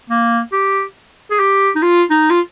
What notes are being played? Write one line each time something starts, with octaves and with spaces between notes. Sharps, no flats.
A#3
G4
G#4
G4
D#4
F4
D#4
F4